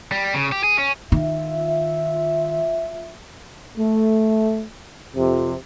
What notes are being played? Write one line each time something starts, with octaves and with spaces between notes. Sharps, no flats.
G3
C#3
G4
G#4
C#4
D#3 F4 E5
A3
F2 C3